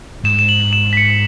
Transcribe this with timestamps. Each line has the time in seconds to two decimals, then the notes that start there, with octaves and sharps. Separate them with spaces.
0.24 G#2 E7
0.39 E7
0.49 F#7
0.73 E7
0.93 B6
0.97 C#7